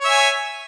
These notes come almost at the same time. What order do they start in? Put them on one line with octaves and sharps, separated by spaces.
C#5 E5 G#5